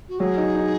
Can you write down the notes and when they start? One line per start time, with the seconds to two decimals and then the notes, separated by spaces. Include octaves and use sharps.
0.09 F#4
0.19 F#3 G#4
0.38 D#4
0.55 D#4